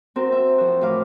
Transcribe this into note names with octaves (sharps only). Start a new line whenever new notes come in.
C4 F#4 A#4
E5
F3 F#4
A2 E3 A#4 F5 D6 F6